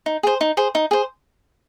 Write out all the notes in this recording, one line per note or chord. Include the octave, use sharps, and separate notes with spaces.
D#4
G#4 C5
D#4
G#4 C5
D#4
G#4 C5